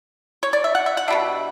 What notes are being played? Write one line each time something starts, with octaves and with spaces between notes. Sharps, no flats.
C#5
D5
E5
F#5
E5
F#5
B2 G3 D4 E5